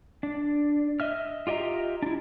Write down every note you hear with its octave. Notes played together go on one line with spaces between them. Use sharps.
D4
D#5 E5 F6
F4 G4 D#5 E5 A#5
D4 E4